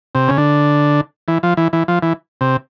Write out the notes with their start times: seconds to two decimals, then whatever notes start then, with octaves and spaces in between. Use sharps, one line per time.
0.15 C3
0.28 C#3
0.38 D3
1.28 E3
1.43 F3
1.57 E3
1.73 E3
1.88 F3
2.03 E3
2.41 C3